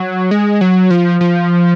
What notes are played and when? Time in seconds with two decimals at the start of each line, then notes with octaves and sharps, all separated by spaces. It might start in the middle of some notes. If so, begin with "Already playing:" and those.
Already playing: F#3
0.31 G#3
0.61 F#3
0.90 F3
1.21 F3